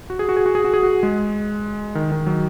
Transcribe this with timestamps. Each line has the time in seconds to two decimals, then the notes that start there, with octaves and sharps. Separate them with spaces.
0.10 F#4
0.19 G#4
0.29 F#4
0.37 G#4
0.46 F#4
0.55 G#4
0.65 F#4
0.74 G#4
0.83 F#4
1.03 G#3
1.95 D#3
2.12 D#3
2.26 F#3